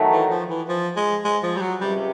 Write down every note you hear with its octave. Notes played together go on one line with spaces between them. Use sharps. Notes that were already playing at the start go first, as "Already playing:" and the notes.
Already playing: D#3 F#3 A3
E3
F3
E3
F3
G#3
G#3
F3
G3
F#3
C#2 C3 G3